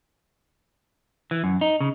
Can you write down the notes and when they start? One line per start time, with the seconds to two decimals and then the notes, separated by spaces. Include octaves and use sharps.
1.31 E3
1.44 F#2
1.61 D#4
1.81 C#3